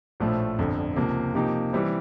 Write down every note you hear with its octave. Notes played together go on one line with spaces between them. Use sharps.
A#1 A2 F3 A3
G1 F2 D3
C#2 C3 F3 A#3
C3 F3 A#3 D#4 G4
E3 G3 C4 E4